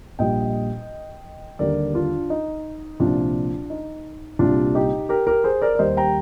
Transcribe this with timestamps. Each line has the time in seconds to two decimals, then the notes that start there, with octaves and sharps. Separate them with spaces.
0.19 A#1 A#2 G3 D#5 G5
1.59 D#2 D3 G3 A#4 D5
1.94 D4 F4
2.30 D#4
3.00 C2 A#2 F3 D4 F4
3.70 D#4
4.39 C2 A#2 G3 D4 F4
4.75 D#4 G4
5.09 G4 A#4
5.27 G4 A#4
5.44 G#4 C5
5.62 A#4 D5
5.75 D5
5.79 D#2 D#3 G3 C5 D#5
5.97 G5 A#5